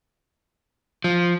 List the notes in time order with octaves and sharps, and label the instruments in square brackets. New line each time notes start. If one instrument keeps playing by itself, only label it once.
[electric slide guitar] F3